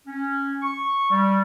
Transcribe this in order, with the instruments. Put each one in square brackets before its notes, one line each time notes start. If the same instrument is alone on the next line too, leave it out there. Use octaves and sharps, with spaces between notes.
[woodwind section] C#4
C#6
G3